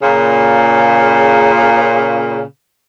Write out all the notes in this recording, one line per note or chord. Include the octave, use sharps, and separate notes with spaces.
A#2 C#3